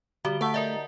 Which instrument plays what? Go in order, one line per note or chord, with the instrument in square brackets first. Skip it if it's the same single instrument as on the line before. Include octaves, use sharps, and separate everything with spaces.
[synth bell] D3 F#4 G7 [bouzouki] G3
[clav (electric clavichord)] A3 [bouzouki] F5 [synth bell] F#5 A5
[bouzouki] D#4 [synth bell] A#4 D5 E5